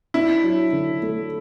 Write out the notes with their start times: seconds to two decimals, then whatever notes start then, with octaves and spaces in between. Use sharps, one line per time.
0.14 D4 E4
0.44 F#3
0.73 D3
1.02 A3